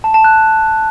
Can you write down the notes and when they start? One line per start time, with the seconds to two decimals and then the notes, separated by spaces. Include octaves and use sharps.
0.04 A5
0.14 A5
0.24 F#6